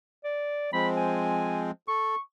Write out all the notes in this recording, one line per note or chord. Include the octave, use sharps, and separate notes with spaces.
D5
F3 G#3 C4 B5
G#5
A4 C#6